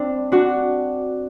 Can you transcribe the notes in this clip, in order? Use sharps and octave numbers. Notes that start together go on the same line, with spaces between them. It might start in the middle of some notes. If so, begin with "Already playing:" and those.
Already playing: C4 D4
D4 F#4